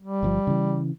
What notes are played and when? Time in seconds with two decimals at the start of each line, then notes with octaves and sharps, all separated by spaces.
0.02 G3
0.23 G1 A#2 F3
0.47 C#3 E3